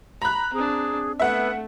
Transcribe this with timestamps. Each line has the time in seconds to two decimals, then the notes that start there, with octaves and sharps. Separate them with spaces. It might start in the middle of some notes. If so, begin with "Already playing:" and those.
0.22 A#5 B5 F#6
0.53 C4 D4 G#4
1.20 A3 B3 E5 F#5